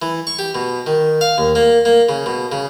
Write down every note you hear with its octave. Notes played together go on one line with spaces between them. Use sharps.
E3
C#6
G4
B2
D#3
F5
D#2
A#3
A#3
C#3
B2
C#3